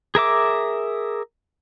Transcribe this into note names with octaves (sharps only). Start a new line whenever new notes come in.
G#4 A#4 E5 D6